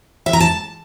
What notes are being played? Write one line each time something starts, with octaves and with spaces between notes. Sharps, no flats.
E5
A#5
A5